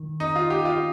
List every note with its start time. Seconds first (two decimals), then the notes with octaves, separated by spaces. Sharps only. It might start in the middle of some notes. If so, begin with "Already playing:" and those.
Already playing: D#3
0.20 D#4
0.36 F4
0.50 G4
0.65 F4